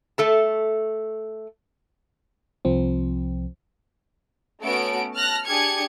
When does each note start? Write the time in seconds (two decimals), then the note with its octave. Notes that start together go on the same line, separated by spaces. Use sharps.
0.18 A3 A4 A5
2.65 C2 F3 C4
4.62 A3 B3 C#4 F#4 D7
5.14 A5 F6 F#6 A#6
5.46 D4 G4 G#4 A5 G#6 C#7